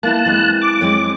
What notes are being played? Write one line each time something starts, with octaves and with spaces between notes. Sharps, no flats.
A#3 B3 E4 A5 F#6
E3 G#3 C4
D6
G#3 C4 C#5